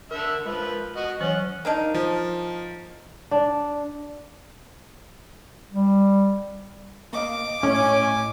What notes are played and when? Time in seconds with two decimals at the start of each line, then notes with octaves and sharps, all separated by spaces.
0.11 D3 A#4 E5
0.46 F3 G#3 A#4 B4
0.96 F#4 D#5
1.20 E3 F#3 C#4 C#5 F#5
1.65 A#3 D4 D#4
1.94 F3
3.31 D4
5.71 G3
7.13 A#3 D#5 F5 D6
7.63 A2 A3 C#4 D#5 G#5